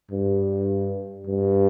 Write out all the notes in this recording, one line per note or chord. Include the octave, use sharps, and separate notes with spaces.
G2
G2